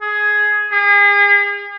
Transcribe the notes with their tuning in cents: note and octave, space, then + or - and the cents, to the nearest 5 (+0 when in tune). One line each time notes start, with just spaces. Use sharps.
G#4 +10
G#4 -40